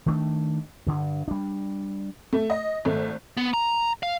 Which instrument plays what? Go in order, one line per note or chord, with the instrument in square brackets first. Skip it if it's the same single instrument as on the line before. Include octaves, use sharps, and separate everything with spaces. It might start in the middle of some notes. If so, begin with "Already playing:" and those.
[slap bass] D#3 A3 D4
G2 D3
G3 D4
[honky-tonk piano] A3
D#5
G#1 A3
[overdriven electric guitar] B3
A#5
F5